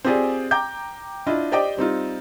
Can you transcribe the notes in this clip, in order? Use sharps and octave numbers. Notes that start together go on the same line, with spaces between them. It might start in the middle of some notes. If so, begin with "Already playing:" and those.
C4 F4 G4 G#4 D5 G#5
G5 A#5 D6 G6
D4 E4 F4 D#5
G4 C5 D5 D#5 G5 D6
G3 C4 D#4 F4